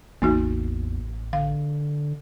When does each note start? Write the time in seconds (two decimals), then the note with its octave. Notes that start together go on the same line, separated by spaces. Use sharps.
0.22 A1 E2 A#3 D#4 F#4
1.33 D3 F5